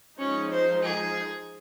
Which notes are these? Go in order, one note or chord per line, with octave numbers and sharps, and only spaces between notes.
F3 G#3 C#4 D#4
C5
G#4